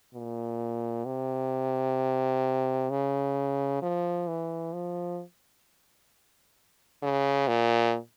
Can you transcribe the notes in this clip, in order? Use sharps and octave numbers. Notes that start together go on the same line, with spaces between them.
A#2
C3
C#3
F3
E3
F3
C#3
A#2